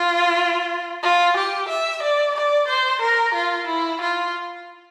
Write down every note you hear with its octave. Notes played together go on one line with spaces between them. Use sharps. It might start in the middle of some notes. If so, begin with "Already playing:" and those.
Already playing: F4
F4
G4
E5
D5
D5
C5
A#4
F4
E4
F4